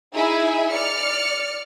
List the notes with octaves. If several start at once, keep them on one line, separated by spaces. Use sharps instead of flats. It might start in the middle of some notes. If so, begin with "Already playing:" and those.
D#4 E4 G#4 E5 G#5
D5 F6 C#7